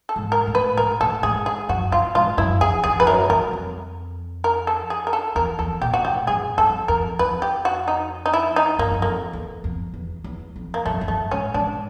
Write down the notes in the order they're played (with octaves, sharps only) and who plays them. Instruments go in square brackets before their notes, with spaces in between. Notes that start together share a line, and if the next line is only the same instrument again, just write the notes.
[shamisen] A4
[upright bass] G#2
[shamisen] A#4
[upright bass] A2
[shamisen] B4
[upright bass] G#2 [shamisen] A#4
[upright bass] A2 [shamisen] A4
[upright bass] G#2 [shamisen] G#4
[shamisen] G#4
[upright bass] F#2 [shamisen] F#4
[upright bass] G2 [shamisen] F4
[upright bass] G#2 [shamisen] F4
[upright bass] F#2 [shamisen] E4
[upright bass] F2 [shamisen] G#4
[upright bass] F2 [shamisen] G#4
[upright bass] F2 [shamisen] B4
[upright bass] F#2 [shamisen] A#4
[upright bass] G2 [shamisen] A#4
[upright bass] F2
[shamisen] A#4
A4
G#4
A#4
A4
[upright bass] E2 [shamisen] A#4
[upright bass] E2 [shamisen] A4
[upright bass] A#2 [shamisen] G4
[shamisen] F#4
[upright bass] A2 [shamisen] G4
[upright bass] G2 [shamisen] G#4
[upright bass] F2 [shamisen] A4
[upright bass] F2 [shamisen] A#4
[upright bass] F2 [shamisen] B4
[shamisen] G4
F#4
D#4
D#4
E4
D#4
[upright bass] G2 [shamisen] A#3
[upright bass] F#2
[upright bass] F2 [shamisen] A#3
[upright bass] E2
F2
E2
E2
F2
[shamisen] A#3
[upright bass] F#2 [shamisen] A3
[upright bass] F#2
[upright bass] G2 [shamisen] A3
[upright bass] G#2 [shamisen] C#4
[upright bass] G#2 [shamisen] D4